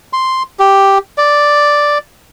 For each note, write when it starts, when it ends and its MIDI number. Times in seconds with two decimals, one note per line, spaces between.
0.13 0.43 84
0.59 0.98 67
1.18 1.98 74